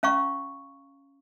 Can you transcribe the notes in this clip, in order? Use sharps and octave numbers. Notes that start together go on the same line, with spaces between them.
C#4 F5 A#5 C#6